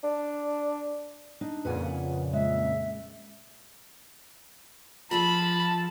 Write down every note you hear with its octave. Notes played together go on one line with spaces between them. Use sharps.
D4
D4 D#4
F2 A#2 C#3 B4 F#5 G#5
G#3 E5
F3 F4 G#4 A4 A5 B5